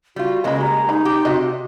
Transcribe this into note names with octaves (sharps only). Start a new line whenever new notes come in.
G3 F4 F#4
C#3 G#3 A#3 B4 D#5 B5
G3 A#5
G3 D#4 B5
G4
C3 F#4 D5 D#5